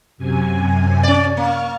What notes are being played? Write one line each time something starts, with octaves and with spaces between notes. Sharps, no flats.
F#2 C3 G#5
C#4 D5
A#3 C#6 F6